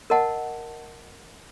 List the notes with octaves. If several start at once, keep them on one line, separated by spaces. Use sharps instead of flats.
A#4 D#5 F#5 A5